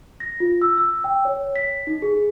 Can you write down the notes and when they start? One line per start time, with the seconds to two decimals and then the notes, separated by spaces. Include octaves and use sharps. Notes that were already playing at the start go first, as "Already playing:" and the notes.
0.20 A#6
0.40 F4
0.62 E6
0.78 E6
1.04 G5
1.25 C#5
1.56 B6
1.87 D#4
2.02 G#4